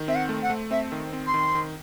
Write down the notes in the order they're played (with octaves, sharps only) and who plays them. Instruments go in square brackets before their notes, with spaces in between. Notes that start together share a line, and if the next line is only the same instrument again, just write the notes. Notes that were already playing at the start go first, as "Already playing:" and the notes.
Already playing: [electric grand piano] D#3
[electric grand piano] C4 [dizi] E5
[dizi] F#5
[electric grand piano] A3
[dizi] F#5
[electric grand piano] A3
[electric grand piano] C4 [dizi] E5
[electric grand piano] D#3
C4
[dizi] C6
[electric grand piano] D#3
D#3